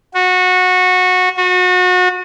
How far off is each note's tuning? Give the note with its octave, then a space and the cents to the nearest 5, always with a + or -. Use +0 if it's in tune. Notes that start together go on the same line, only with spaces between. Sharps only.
F#4 -20
F#4 -30